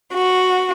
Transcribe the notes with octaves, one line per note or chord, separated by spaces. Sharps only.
F#4